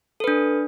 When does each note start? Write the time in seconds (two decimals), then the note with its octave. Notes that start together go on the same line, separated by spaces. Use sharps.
0.20 A4
0.24 B4
0.28 D4